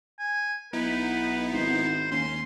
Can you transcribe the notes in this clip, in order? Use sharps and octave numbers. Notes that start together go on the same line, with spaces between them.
G#5
B1 B3 D#4 E4 B4
G#1 C5
D#2 C#4 C6